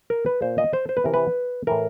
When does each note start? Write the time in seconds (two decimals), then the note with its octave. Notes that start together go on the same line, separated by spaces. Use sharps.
0.10 A#4
0.26 B4
0.42 A#2 C5
0.58 D#5
0.73 C5
0.89 C5
0.97 B4
1.04 C3 E3 A#4
1.14 B4
1.67 A2 E3 A#4